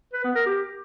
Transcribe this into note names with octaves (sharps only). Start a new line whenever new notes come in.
B4
B3
A#4
G4